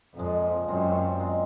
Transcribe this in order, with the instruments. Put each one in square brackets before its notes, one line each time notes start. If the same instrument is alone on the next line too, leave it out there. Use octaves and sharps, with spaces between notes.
[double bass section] F2 [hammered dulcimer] A#2 F3 G#3
[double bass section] F#2 [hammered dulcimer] A#2 G#3 C4 F4
[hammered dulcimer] A#2 G#3 C4 F4